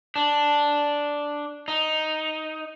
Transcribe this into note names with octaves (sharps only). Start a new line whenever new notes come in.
D4
D#4